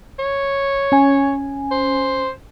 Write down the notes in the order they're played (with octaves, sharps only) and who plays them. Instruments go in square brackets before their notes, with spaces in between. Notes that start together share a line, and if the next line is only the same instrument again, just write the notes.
[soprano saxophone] C#5
[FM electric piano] C#4 G#5
[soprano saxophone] C5